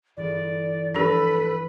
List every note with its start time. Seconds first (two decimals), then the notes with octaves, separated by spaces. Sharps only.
0.17 G1 E3 D5
0.94 F3 D4 G4 A4 B4